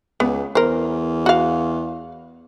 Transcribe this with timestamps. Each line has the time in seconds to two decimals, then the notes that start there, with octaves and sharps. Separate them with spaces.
0.20 C#2 B3
0.55 E2 A#4 C5
1.26 F#4 F5